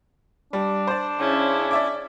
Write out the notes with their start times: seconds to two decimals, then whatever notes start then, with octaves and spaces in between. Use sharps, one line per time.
0.53 G3 D4
0.87 C5 D5
1.19 C#3 C#4 E4
1.71 D5 E5 D6